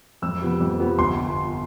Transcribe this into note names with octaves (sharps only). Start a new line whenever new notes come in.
F2 E6
C3 F3 B3
F2
C3 F3 B3
G1 C6